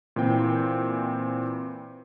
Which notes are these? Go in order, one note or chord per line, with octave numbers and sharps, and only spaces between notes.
A#2 E3 C4 G5